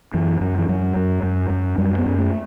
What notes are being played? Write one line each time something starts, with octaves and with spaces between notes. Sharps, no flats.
F#2 E3
F#2 F#3
E3
F#2 F#3
F#2
F#2
F#2
F#2 G3
B3
F#2
A3